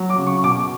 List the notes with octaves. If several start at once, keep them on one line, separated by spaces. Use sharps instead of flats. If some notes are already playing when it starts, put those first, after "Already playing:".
Already playing: F#3
D6
C#3
C#6
B2 D6